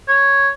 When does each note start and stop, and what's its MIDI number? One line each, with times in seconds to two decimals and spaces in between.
0.08 0.49 73